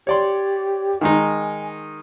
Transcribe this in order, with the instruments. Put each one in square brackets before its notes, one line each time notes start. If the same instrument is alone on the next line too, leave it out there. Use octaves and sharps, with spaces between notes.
[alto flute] G4 [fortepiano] C#5 D5 C6
[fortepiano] D#3 G#3 D#4 [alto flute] G#5